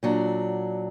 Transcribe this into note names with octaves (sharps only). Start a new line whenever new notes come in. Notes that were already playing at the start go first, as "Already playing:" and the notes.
A#2 F#3 D4